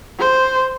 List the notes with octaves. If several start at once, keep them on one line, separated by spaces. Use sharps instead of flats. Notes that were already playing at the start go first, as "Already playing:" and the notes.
C5